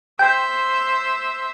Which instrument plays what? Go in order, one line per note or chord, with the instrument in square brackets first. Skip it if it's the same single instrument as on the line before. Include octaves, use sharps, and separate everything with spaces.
[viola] C5 E5 [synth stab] G5